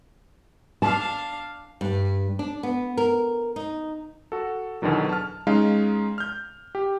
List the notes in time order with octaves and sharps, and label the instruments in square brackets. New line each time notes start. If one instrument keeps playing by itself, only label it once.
[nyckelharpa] D4 F5 [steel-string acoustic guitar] A5
[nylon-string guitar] G2
D4
B3
A#4
D#4
[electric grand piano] F#4 A4
E2 B2 D3 D#3 F#3
A5 F6
G#3 C#4 D#4 F5
F6 G6
G4